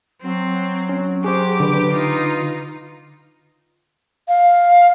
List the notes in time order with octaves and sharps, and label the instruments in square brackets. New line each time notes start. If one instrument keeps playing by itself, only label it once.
[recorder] F#3 [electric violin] C4
[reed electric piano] C#4
[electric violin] G4 D6 [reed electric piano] G#4 C5
[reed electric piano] D3 B4
[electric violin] D#4 F4
[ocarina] F5